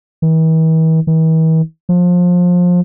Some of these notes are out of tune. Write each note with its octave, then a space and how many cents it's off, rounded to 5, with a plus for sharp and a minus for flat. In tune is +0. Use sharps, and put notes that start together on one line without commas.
E3 -45
E3 -45
F3 +25